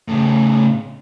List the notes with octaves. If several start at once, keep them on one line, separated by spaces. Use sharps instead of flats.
A2 C#3